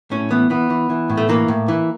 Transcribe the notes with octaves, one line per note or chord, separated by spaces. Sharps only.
A2 C#4
E3 B3
E3 B3
E3
E3
A2
A3
E3 A#3
A2
E3